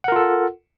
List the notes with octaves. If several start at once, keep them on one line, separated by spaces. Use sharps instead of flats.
F4 A4 A#4 F#5